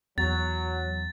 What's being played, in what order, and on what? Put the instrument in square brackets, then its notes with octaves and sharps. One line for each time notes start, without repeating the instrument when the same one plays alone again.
[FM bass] E2 [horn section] F#3 [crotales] A6